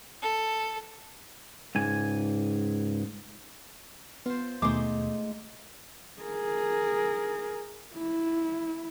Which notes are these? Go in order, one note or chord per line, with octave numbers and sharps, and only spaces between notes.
A4
C#2 G#2 G#5
B3 F4 C5
D#2 B2 G#3 A3 D#4 C5 D6
G#4 A#4
E4